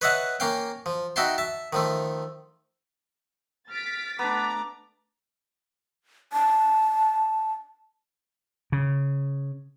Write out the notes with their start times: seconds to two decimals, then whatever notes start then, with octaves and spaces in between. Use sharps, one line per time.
0.01 B4 C#5 D#5 E5 F#5 A5
0.40 A#3 C#4 F5 G5
0.86 F3
1.16 D#4 F#4 E5 G5 A5 C6
1.38 E5 A5
1.73 D#3 F3 A3
3.70 F6 A6 B6 D7
4.19 A3 B3 D4 A#5 D6
6.33 A5
8.72 C#3